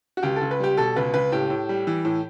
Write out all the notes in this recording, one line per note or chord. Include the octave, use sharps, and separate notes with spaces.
F#4
C#2 G4
A4
C#2
B4
G3 G4
B2 A4
C#2 B4
C#2 B4
A2 G4
A2
G3
E3
A2